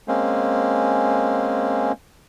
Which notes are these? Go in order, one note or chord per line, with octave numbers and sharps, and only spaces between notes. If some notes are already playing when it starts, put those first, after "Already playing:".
G#3 A#3 C4 C#4